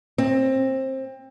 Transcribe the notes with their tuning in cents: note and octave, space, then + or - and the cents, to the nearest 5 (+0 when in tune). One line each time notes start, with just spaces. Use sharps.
C4 +20